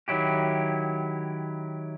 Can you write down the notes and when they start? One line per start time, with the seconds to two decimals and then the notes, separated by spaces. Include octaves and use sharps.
0.08 D#3 F#3 E4 G4